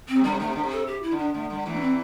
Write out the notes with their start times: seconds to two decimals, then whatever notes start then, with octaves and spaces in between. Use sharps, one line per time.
0.09 C4
0.16 C3
0.24 D3 G3
0.32 C3
0.40 D3 A3
0.47 C3
0.56 D3
0.63 C3
0.72 A4
0.87 G4
1.03 E4
1.11 D3
1.19 D4
1.34 D3 A3
1.50 D3 G3
1.66 E2 E3 A3
1.75 D4
1.81 C4